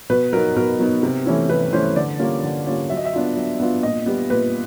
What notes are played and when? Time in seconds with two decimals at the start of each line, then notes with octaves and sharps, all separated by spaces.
0.10 B2 B4
0.33 F#3 B3 D#4 A#4
0.56 B2 A#4
0.79 F#3 B3 D#4
1.03 C3
1.26 E3 A3 C#4 E4
1.49 C3 B4
1.73 E3 A3 C#4 E4 C5
1.96 D3 D5
2.19 G3 A#3 C#4 F4
2.43 D3
2.66 G3 A#3 C#4 F4
2.90 F#3 E5
2.97 D#5
3.05 E5
3.13 B3 D4 F4
3.37 F#3
3.60 B3 D4 F4
3.83 A#2 D#5
4.06 G3 B3
4.30 A#2 B4